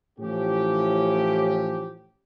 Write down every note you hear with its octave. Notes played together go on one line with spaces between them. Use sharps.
A2 E3 F3 C#4 G4